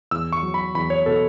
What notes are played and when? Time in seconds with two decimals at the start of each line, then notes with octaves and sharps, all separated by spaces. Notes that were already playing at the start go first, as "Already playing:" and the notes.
0.11 E2 E6
0.33 C#6
0.43 F#3
0.54 B5
0.75 E2 B5
0.90 C#5
1.06 B2 A4